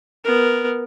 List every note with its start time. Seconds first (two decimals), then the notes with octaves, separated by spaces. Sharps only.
0.24 B3 A#4